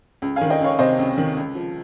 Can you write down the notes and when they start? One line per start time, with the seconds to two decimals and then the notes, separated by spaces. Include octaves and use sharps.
0.22 C#2
0.36 F5 G#5
0.41 D#3
0.50 D#5 G5
0.60 C#2 C#5 F5
0.79 C3 C5 D#5
0.98 C#2
1.18 D#3
1.37 C#2
1.55 F3